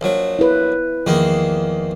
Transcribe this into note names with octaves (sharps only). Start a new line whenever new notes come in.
A#1 F#3
E4 B4
E2 D#3 F3 A#3